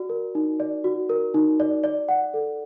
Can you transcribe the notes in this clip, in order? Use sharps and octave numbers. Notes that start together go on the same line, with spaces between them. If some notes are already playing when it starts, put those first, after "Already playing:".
Already playing: F#4 D5
A#4
D#4
D5
F#4
A#4
D#4
D5
D5
F#5
A4